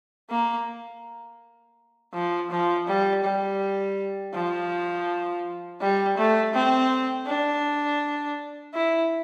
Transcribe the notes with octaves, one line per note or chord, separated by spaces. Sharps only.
A#3
F3
F3
G3
G3
F3
G3
A3
C4
D4
E4